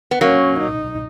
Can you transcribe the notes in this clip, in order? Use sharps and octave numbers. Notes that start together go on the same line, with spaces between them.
B3
F#3 A#3 C#4
D#4